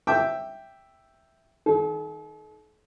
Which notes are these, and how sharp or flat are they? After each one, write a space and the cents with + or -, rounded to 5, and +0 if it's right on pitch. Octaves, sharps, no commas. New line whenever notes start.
E5 +0 G5 +0 D6 +0
D#3 +20 A4 -45